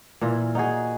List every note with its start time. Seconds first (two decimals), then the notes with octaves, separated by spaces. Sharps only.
0.21 A#2 E3 F4
0.55 D#4 F#4 G#4